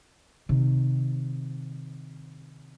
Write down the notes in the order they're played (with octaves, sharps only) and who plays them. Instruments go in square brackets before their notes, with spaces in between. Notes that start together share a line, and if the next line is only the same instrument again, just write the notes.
[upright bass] C3 D#3